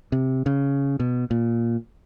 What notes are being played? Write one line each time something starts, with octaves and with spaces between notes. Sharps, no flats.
C3
C#3
B2
A#2